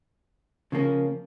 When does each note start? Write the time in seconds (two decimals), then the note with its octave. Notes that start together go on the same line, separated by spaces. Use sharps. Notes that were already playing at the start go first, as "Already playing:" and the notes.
0.72 C#3 F3 A#3 C#4